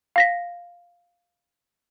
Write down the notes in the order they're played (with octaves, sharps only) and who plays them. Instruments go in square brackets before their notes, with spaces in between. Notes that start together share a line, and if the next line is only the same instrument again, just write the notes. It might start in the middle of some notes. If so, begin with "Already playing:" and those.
[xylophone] F5 A#6 B6